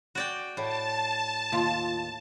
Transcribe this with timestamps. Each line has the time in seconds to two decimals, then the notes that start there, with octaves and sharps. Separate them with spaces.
0.15 F#4 D5 G5
0.57 A2 A5
1.52 D#2 F4